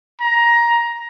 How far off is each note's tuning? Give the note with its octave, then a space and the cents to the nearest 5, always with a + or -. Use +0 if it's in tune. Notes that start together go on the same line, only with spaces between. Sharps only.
A#5 +15